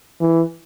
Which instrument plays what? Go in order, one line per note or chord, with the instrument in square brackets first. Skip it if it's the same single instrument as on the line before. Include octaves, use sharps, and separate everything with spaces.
[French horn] E3